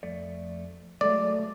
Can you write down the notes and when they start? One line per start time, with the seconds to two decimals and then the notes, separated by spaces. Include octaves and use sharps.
0.03 F2 A3 D5
1.01 F#3 G#3 A3 D5